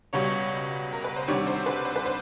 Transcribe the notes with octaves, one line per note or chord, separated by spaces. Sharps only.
C#2 B2 G3 C#5
A#4
B4
C5
D2 C3 D#3 G3 C#5
C5
B4
C5
B4
C5